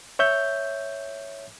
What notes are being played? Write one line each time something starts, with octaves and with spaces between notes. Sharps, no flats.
C#5 E5 G6